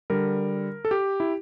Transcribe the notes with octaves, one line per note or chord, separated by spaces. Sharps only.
D3 G3 A#4
A4
G4
E4